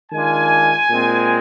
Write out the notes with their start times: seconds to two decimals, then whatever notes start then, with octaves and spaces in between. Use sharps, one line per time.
0.12 D#3 G#3 D4 F4 G#5
0.89 A#2 G#3 C4